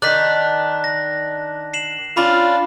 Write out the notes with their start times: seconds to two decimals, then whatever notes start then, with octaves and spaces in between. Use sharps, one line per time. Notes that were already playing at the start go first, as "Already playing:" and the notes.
0.02 D#3 D4 F#6 B6
0.84 A#6
1.74 C7 E7 F#7
2.17 C#4 D4 F4 B5